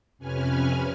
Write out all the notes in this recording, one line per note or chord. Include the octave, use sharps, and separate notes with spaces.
F2 C3 C#4 B4 G#5 F6